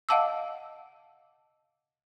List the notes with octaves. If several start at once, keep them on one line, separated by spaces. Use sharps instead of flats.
D#5 F5 F#5 A5 D6 E6